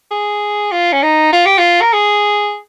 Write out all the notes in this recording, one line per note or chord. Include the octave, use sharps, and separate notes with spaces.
G#4
F4
C#4
D#4
F4
G4
F4
A#4
G#4